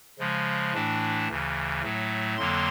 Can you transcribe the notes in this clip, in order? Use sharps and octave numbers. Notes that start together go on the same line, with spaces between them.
C#3 F3 G#3
A2 E3 A3 D4
D2 C#3 E3
A2 F#3 A3
F2 D3 F#3 A#3 C6